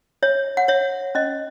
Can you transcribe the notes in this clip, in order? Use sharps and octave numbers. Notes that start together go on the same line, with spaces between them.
C#5 E5
F#5
C#5 E5
C#4 D#5